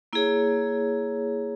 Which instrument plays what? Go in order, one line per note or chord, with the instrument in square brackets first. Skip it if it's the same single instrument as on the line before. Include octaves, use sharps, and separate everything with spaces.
[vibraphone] A#3 E4 G#4 C#5